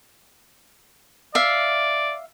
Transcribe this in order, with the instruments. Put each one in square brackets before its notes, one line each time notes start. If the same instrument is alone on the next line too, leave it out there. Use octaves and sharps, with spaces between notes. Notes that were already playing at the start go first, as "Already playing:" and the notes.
[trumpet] D5 [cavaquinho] E5 F5